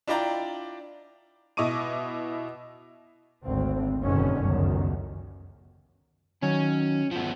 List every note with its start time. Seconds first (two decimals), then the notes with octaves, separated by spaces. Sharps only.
0.08 D4 E4 F4 D5 G5 A#5
1.57 B2 E4 D#5 C#6 D6 D#7
3.45 G#1 D2 C4
4.02 F#1 G#2 B2 D3 D#3 C#4
4.43 G1 C#2 F#2 D#3
6.43 D#3 F#3 C#4
7.11 F3 B3